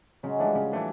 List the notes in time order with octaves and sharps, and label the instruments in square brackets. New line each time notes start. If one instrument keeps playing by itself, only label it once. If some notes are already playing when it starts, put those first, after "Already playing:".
[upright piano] C#3 [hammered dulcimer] F#3 G#3
[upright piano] E3 A3 D4 [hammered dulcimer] F3 G3
[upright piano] C#3
E3 A3 D4